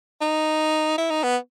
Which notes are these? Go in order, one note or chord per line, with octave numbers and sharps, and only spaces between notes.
D#4
E4
D#4
B3